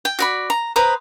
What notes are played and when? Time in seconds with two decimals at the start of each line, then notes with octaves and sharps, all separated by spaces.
0.05 G5
0.19 F#4 D5 B5
0.50 A#5
0.76 B4 C5 A#5 D#6